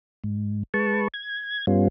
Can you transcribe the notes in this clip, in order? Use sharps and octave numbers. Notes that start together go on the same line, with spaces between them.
G#2
G#3 B4 A5 C#6
G#6
G2 G3 B3 C#4 F4